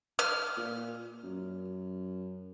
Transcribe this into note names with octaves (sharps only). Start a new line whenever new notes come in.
F6
A#2
F#2